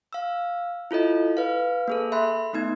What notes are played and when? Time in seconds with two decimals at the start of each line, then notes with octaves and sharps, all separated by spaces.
0.13 F5 E6
0.91 E4 F4 A4 D#5
1.37 B4 F5
1.88 A#3 G#4 A4
2.12 E5 B5 C6 F#6
2.53 A3 B3 D#4 G#6